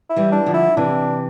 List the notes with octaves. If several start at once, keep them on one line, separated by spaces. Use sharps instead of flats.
E4
E3 G3
D4
D3 F3
E4
C3 E3 D4